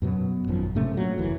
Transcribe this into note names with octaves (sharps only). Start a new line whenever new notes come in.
F#2 B2 F#3 B3
G#1 F#2 F3
G#2 C3 A3 C#4
A#2 F#3
F1 D#2 E3